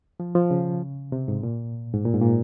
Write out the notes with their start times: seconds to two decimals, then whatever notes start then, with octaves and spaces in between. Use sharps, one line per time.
0.20 F3
0.35 F3
0.51 C#3
1.12 C3
1.28 G#2
1.43 A#2
1.94 G#2
2.05 A#2
2.14 G#2
2.21 A#2